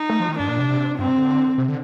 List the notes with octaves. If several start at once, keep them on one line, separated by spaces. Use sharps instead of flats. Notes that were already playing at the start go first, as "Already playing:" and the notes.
Already playing: D#4
A3
F3
D#3
G2 D4
A#2
C3
G2 C4
C3
D3
C3
D3